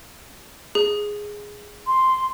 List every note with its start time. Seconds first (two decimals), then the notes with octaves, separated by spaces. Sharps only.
0.75 G#4
1.87 C6